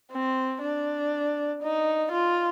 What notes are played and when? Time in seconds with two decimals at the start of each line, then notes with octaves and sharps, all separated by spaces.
0.11 C4
0.62 D4
1.62 D#4
2.11 F4